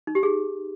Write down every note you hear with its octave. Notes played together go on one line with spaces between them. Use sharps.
D#4
G4
G#4